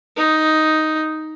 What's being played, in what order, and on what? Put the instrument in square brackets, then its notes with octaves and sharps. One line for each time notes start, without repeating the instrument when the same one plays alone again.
[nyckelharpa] D#4